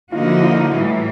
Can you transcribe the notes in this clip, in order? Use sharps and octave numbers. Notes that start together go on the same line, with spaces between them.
D3 F3 A#3 D#4 F4 F#4
E4
F4
A2 E3 G3 E4